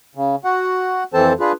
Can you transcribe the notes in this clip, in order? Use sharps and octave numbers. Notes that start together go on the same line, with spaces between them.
C#3
F#4 F#5
F2 E3 C4 A4 C5 A5
D4 F4 G#4 B4